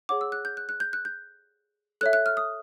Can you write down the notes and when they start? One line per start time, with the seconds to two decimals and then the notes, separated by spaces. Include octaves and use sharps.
0.09 G#4 C#5 F#5 D6
0.21 E6
0.32 F#6
0.45 G6
0.57 F#6
0.69 F#6
0.80 G6
0.93 F#6
1.05 G6
2.01 A4 C#5 E5 F#6
2.13 F#6
2.26 F6
2.37 D#6